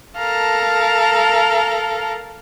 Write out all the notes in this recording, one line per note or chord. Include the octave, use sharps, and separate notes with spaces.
A4 A#4 F5 A5 A#5